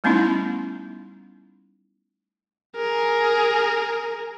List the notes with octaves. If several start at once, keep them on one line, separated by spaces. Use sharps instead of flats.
G3 A3 B3 C#4 D#4 E4
G#4 A#4